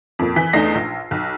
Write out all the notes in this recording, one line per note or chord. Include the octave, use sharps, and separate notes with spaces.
F2 A#2
E3 B6
E2 A3 D4 D#4 A#6 C7
A#1
B1